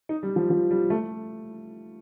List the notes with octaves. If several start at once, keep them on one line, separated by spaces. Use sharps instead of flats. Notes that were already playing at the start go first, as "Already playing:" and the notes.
D#4
G3
F3
F3
G3
A3